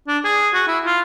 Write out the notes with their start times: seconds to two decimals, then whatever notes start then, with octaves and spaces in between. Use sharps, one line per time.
0.08 D4
0.24 G#4
0.54 F#4
0.67 E4
0.85 F4